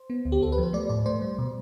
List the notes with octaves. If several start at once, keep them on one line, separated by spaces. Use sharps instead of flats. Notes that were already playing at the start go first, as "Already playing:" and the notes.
Already playing: C5
B3
D2
G4
D2 A4
B4
F3
C5
A3 D5
A2 D5
A3 C5
G3
B2